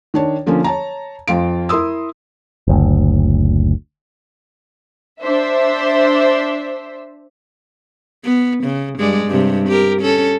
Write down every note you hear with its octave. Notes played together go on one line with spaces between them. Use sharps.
D#3 D4 C#5
D3 F3 A#3 C#4
C#5 A5 A#5
F2 F4 D7
E4 A#4 C6 D#6 E6
F#1 D2
D4 C5 E5
B3
C#3
G2 G#3 D5
G2 C3
G4 A#4
C#4 A4